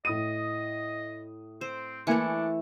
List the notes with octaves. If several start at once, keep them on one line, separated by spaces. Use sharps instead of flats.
A2 D#5 D#6 D#7
C4 C5
E3 A3 A#3 D4 G#5 C#7